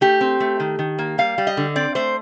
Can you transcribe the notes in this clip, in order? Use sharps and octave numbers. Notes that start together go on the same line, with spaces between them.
A3 G4
C4
A3
D#3
D#3
A#3
G3 F5
G3
D#5
D3
C4 D5
A3 C5